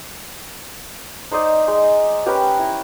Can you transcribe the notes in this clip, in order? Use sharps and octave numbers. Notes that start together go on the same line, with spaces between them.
D#4 C5 D5 D#5
G#3
C#4 G4 A#4 B4
E4